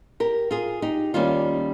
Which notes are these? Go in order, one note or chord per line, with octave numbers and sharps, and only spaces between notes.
G4 A#4
F4 G#4
D#4 G4
D#2 D#3 G3 A#3 C#4 F4